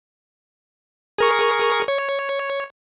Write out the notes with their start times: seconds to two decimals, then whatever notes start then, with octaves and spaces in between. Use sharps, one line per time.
1.18 G#4 A#4 C#6
1.88 C#5